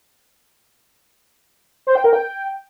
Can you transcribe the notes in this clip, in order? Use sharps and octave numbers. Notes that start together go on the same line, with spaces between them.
C5
G5
A#4
G5